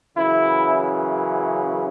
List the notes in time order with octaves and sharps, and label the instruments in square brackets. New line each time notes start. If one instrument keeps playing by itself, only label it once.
[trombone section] F#2 C#3 E3 E4